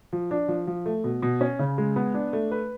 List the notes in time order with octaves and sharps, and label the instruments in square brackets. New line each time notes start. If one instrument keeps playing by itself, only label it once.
[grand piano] F3
D4
F3
F3
A3
B2
B2
C#4
C#3
G#3
B3
D4
A3
B4